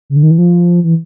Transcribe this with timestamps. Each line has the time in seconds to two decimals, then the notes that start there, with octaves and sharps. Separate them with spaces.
0.10 C#3
0.16 D3
0.23 D#3
0.31 E3
0.38 F3
0.84 E3